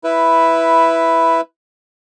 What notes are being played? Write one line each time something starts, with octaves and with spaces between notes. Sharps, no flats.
E4 B4